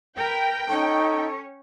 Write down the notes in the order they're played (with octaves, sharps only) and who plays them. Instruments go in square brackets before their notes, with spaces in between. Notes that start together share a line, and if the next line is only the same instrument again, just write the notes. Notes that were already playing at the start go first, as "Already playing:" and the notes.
[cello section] A#4 B4 [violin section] G5
[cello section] C#4 C#5 [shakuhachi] D#4 [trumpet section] A4 C#6